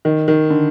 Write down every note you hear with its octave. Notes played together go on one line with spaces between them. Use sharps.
D#3
D#3
D3